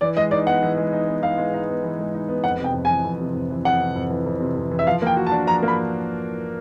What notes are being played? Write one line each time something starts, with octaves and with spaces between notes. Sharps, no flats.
E3 D5
G#3 D#5
D#4 D5
B3 F#5
E3
G#3
D#4
B3
E3 F5
G#3
D#4
B3
E3
G#3
D#4
B3
F2 F#5
C3 G5
F2
E3 G#5
F2
C3
F2
E3
F2 F#5
C3
F2
E3
F2
C3
F2
E3
E5
F3 F5
A#3 G5
F#4
A5
D4
F3 A#5
A#3
B5